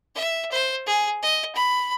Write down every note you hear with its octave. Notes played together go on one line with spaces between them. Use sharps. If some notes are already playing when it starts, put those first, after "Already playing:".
E5
C5
G#4
D#5
B5